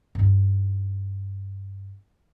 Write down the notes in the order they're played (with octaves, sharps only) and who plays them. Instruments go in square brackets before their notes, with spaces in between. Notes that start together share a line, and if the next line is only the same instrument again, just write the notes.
[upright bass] G2 D#4